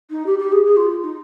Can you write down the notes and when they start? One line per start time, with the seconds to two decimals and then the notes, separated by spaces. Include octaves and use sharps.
0.10 D#4
0.26 G4
0.39 G4
0.52 G#4
0.65 G#4
0.76 F4
1.03 D#4